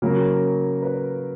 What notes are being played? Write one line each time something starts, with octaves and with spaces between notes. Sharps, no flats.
C#3 F#3 A#3 A#4
B4